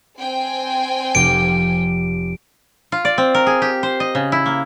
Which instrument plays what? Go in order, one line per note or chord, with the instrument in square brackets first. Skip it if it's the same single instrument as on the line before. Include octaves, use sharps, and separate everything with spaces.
[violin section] C4 G5 G#5
[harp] F1 G4 F5 [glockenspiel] D7
[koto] F4
D5
C4
A#4
G#4
G4
C5
D#5
C#3
E4
A#3